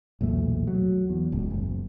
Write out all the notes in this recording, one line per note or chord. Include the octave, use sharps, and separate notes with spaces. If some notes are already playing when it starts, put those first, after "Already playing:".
B1 E2 A#2 A3
F#3
E2
D#1 C#2
F#1